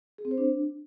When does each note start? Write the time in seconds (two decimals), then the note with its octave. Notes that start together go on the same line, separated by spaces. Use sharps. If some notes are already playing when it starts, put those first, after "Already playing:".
0.18 G#4
0.25 C4
0.31 C5
0.38 D4